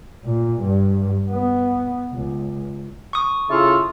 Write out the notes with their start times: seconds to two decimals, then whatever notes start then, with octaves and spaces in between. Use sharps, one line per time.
0.25 A#2
0.62 G2
1.30 B3
2.13 C#2
3.13 C#6 D#6
3.50 C#3 E4 F4 A4